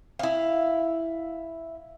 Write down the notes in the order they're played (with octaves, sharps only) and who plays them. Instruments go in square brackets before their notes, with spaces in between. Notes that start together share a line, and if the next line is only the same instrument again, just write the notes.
[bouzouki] E4 F5